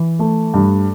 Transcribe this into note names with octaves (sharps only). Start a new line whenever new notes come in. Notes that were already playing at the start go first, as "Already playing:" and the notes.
Already playing: E3
A3
G2